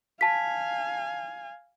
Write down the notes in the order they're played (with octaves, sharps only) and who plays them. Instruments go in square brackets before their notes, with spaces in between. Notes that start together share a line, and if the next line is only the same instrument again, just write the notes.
[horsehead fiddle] F5 G#5 [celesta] A5 B6